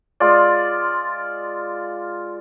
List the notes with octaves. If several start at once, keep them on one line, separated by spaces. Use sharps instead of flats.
G#3 F4 D5